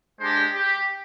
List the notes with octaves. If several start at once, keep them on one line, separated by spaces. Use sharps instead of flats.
G#3 D4 G4 C5
G4